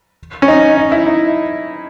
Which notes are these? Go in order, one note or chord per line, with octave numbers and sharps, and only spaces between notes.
C#4
D#4
D#4
E4
D#4